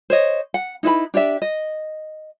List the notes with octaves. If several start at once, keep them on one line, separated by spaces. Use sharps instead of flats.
C5 C#5 D#5
F#5
D#4 E4 B4 B5
D4 G4 D5 E5
D#5